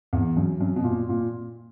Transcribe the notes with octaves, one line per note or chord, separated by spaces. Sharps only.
E2
F#2
F#2
B2
A#2
A#2